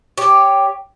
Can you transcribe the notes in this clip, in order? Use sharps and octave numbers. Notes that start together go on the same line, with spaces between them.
G4 C#5